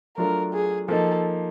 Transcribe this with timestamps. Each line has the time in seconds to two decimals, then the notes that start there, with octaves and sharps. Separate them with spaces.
0.17 F#3 A3 D4 F4 A#4
0.53 G#4
0.88 F3 A#3 D#4 A4